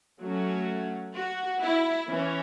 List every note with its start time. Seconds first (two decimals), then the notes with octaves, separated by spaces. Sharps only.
0.21 F#3 A3 C#4 F#4
1.15 F#4
1.61 E4
2.08 E3 C#4